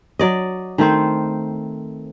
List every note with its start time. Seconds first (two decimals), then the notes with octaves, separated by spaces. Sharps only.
0.19 F#3 D5 D#5
0.78 D#3 A3 C4 C5